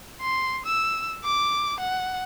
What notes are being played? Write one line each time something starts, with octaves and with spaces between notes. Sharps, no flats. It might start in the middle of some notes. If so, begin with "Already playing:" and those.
C6
E6
D6
F#5